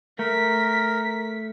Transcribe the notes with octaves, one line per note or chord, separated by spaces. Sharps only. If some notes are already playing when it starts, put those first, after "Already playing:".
A3 A#4 B6